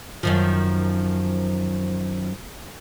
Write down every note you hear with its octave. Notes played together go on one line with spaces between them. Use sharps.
F#2 D#3 F3